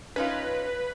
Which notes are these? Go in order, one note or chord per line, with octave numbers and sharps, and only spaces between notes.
C#4 D#4 F4 B4